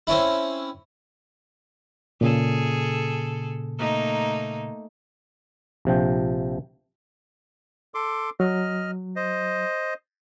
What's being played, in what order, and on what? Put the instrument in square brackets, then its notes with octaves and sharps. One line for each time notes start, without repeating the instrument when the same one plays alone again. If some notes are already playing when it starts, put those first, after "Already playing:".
[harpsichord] C4 C#4 E4
[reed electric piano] A#2 C#3 [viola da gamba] G#4 A4
[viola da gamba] A3 A#3 D#4
[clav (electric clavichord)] A#1 C3 F3 G5
[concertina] A4 C6 D6
[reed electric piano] F#3 [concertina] D#5 F6
[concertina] C5 D#5